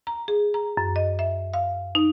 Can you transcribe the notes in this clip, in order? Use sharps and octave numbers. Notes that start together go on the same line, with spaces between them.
A#5
G#4
A#5
F#2
D#5
E5
F5
D#4